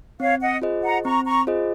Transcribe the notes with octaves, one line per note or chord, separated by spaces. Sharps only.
C4 C#5 F5
D#5 F#5
F4 G#4 C5 D#5
F#5 A#5
C4 A#5 C#6
A#5 C#6
F4 G#4 C5 D#5